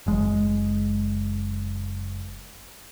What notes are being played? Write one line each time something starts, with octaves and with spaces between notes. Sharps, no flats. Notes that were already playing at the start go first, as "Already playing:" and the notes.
F#1 G#3